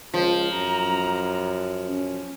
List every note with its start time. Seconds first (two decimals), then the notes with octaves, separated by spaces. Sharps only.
0.14 C#2 F3 F4
0.53 F#2 A#5
1.87 C#4